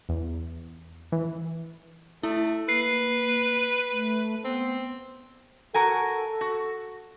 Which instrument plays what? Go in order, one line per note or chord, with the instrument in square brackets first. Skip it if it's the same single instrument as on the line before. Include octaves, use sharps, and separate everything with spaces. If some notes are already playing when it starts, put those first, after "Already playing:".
[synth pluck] E2
E3
[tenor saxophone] A3 [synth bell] E4
[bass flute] A#3 [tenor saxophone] B4 [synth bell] C7
[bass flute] A3
[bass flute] B3 [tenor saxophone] C4
[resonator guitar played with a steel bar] F#4 A#4 G#5 [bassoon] A4
[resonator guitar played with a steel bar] F#4